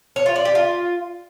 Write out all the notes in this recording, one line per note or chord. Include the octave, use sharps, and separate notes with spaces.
C#5
F4
D5
G4
F4